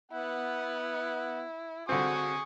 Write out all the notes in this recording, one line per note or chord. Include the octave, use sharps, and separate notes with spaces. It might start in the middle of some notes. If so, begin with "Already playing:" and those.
B3 E4 F#5
D3 C4 F#4 G#5 C#6 D#6